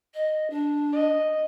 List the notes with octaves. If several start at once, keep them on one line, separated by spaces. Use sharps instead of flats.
D#5
D4
D#5